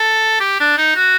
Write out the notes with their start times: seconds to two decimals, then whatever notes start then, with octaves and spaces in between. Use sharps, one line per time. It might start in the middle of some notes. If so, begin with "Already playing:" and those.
Already playing: A4
0.40 G4
0.60 D4
0.78 D#4
0.96 F#4